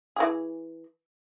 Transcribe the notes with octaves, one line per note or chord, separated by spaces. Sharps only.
E3 G#4